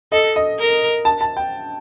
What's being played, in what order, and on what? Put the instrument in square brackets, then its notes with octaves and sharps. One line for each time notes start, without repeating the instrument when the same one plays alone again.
[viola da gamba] A4 [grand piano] D#5
[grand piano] D#5
[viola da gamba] A#4
[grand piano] A5
A5
G5